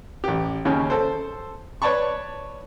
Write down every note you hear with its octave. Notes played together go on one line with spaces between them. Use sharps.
A1 G4
D#2 C#3 C#4
A4 C5
B4 C#5 D5 A5 B5 C#6